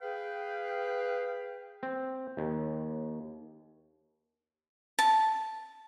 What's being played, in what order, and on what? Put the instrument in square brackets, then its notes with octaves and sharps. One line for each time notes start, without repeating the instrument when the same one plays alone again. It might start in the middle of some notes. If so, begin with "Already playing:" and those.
[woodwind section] G#4 B4 F5 G5
[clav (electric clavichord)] C4
D#2
[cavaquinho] A5